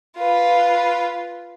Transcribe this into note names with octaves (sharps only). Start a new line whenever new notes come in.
F4 B4